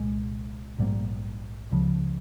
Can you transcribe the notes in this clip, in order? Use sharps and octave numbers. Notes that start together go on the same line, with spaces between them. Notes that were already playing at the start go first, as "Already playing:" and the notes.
Already playing: C2 A#2 G#3
A#1 G#2 G3 A#3
C#2 C#3 F3